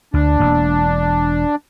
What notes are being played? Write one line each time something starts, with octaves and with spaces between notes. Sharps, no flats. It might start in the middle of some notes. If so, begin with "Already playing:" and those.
D2 D4
E1 A#3